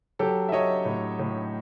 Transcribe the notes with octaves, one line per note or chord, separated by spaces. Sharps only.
F#3 G4 A4
E5
F#3 C#5 D#5
A2
A2